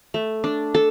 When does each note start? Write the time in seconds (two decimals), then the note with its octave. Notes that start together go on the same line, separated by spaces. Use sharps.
0.14 A3
0.44 D4
0.75 A4